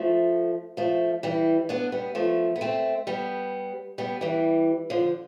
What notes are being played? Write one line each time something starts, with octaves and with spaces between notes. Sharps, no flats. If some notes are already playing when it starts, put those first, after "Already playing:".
Already playing: F3 A3
F3 A3
E3 G3
B3 D4
G3 B3
F3 A3
B3
A3 C4
G3 B3
G3 B3
E3 G3
D3 F3